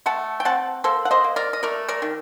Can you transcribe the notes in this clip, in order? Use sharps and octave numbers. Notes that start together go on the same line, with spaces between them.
A3 F#5 A5
G5
C4 F#5 A5
A#3 A4 C5
F#5
C5 D#5
A#3
A#4 D5
D#5
A3 A#4 D5
A#4 D5
D#3